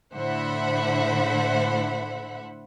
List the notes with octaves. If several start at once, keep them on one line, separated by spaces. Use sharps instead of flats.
A2 D3 C5 E5 F#5 B5